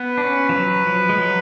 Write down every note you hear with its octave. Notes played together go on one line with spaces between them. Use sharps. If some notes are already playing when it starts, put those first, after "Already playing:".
Already playing: B3 B4
D4
C#4
F3
F#3
F3
G#3
F#3